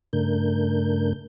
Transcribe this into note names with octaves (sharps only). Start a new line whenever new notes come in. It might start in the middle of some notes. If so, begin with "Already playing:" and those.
G2 C#3 A3 D4 A#4 G6